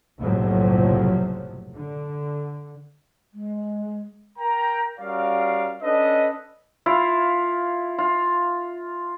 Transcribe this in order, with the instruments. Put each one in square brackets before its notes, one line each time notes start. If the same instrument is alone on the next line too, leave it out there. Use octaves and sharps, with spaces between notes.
[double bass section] F#1 B1 A2 C3 F3 F#3
D3
[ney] G#3
[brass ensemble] A#4 G5 A#5
G3 C#4 F#4 A#4 D5 F5
C#4 D4 A4 B4 D#5
[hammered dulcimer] E4 F4 F5
F4